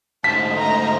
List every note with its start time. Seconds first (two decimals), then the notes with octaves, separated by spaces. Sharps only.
0.24 D2 G#2 A3 C5 D#5 A5 B6
0.57 A#5